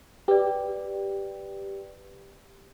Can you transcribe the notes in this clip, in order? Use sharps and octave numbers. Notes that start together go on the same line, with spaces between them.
G4 B4 D5